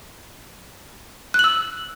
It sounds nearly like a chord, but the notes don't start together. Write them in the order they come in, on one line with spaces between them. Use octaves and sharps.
F#6 F#7 E6